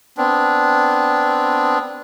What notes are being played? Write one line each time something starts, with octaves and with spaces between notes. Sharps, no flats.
B3 C4 D4